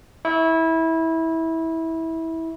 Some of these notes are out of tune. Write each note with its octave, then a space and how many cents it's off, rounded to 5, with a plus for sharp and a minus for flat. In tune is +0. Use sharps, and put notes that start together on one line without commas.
E4 -20 C#6 +0